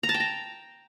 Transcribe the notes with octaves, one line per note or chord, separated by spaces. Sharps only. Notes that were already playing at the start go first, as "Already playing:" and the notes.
A#5
A5
G5
A#5